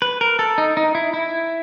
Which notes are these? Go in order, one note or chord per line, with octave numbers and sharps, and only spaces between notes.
B4
A#4
A4
D#4
D#4
E4
E4